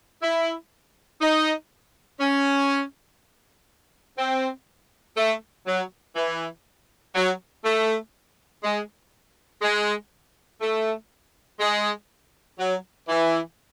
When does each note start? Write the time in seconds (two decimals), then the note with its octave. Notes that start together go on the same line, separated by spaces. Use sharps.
0.22 E4
1.21 D#4
2.20 C#4
4.17 C4
5.17 A3
5.66 F#3
6.15 E3
7.15 F#3
7.64 A3
8.63 G#3
9.62 G#3
10.61 A3
11.60 G#3
12.59 F#3
13.08 E3